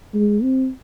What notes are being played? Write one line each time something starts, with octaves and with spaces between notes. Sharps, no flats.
G#3
C4